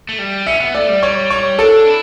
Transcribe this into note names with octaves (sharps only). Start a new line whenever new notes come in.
A3
G3
C#4 E5
B3
A3 D5
G3
C#5
C#5
D4 A4
E4